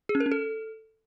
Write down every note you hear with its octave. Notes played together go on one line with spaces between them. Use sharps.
G#4
C#4
A#4
C#4
A4